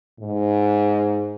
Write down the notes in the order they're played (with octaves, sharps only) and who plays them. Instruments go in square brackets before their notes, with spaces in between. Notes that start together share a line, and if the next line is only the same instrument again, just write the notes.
[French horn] G#2